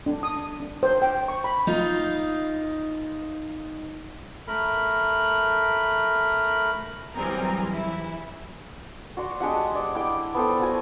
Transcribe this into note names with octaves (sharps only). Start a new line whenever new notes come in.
D4
D#6
D4
C5
G5
C#6
B5
D#4 F4
A3 A#4 B5
E3 F#3 G3 C4 G#4 A#4
E3 E4
F#4 D5 C6
G#3 D4 G4 F#5
D5
E4 G5 D6
B3 A4 C5 G5
F#4 G#5 A5